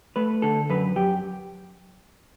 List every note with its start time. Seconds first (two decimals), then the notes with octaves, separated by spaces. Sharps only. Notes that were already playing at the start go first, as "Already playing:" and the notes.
0.16 A3 B4
0.42 D3 A4
0.70 F#2 B4
0.96 F#2 G4